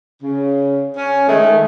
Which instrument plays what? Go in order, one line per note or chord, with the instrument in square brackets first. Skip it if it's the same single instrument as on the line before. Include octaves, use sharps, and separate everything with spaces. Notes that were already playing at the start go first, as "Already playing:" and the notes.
[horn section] C#3
C#4
[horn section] D#3 G#3 [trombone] A3